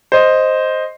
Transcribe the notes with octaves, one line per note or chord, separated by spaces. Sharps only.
C5 D#5